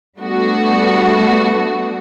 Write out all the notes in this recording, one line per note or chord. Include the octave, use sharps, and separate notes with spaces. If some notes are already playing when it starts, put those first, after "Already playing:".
G3 A3 B3 D4 F#4